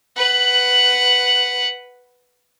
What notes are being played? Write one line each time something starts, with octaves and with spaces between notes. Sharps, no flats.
B4 F#5